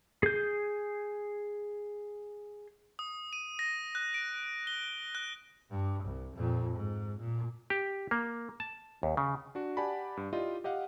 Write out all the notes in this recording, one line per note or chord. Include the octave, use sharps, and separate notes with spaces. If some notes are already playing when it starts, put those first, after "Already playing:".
G#4 G6
D#6
D#7
A#6
F#6
D7
G7
F#6
G2
C2
F2 A#2
G#2
A#2
G4
A#3
A5
D#2
C#3
D4 F#4
G4 D5 F#5 G#5 A5 B5
G2
E4 F4 G4 D5 D#5
G4 D#5 F5 F#5